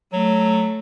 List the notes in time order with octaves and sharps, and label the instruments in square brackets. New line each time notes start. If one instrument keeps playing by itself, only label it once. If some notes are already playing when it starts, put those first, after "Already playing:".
[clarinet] F#3 [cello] A3